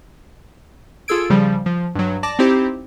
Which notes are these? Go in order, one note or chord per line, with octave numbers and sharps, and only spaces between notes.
F4 G#4 A4 E6 G#6 D7
C#3 F3 G3
F3
G2 F#3
D5 A5 D6 A#6
C4 D#4 E4 G4 C5